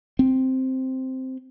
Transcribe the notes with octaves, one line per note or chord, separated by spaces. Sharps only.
C4